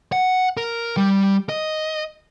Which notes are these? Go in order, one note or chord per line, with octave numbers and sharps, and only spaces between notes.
F#5
A#4
G3
D#5